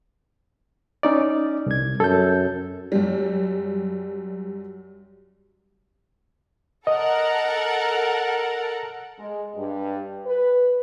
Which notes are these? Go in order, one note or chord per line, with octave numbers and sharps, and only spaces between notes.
C#4 D#4 D5
C2 G#6
F#2 A4 G6
F#2 G3
A4 A#4 D#5 F#5
G#3
G2
B4